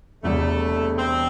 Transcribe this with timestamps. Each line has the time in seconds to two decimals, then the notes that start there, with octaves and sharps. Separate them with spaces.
0.23 E1 E2 C3 G3 A3
0.98 C4